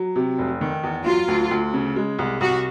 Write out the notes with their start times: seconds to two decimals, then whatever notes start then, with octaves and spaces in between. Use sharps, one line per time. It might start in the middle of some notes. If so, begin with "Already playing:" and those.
Already playing: F#3
0.16 C3
0.39 F1
0.61 D#3
0.83 E2
1.06 F#3 F4
1.28 D2
1.51 D2
1.74 C#3
1.96 G#3
2.19 C2
2.40 C2 F#4